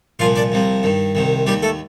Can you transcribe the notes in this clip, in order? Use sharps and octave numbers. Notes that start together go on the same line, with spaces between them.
C2 A#2 F3 F4 F5
D4 D5
C2 C3 F3
G2 D#3
C2 C3 D#3
D#2 D#3 G3 G4
A3 A4